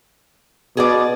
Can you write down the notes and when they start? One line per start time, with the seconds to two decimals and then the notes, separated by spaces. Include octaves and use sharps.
0.77 B2 G#4 D5